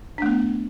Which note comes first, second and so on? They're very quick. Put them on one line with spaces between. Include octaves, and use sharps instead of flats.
D4 A3 B3